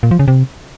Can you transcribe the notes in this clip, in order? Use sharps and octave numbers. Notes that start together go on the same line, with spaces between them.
A#2
F3
C#3
C3